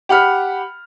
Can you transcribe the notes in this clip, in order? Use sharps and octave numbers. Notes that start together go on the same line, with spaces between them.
G4 F#5 B5 F6